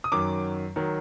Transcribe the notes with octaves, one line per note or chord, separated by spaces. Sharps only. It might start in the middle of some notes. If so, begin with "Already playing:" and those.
D#6
F#2 D#3 F#3 D6
D#3 F#3